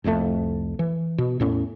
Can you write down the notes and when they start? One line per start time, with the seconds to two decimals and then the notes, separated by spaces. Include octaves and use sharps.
0.04 F1 C2 F2 A3
0.79 E3
1.18 B2
1.40 E2 A2 C#4